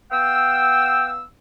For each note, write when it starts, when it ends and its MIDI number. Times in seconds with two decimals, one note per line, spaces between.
0.12 1.23 59
0.12 1.23 77
0.12 1.08 79
0.12 1.23 88